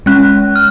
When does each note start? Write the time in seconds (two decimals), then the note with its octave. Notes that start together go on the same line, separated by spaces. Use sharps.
0.06 G#3 C#4 F#6
0.56 F6